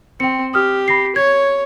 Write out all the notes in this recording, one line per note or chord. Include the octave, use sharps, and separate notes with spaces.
C4 G5 C#7
G4 D#6 F6
B5 A#6 C7
C#5 G#6